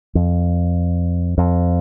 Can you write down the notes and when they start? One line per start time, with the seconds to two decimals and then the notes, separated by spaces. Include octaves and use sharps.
0.15 F2
1.38 F2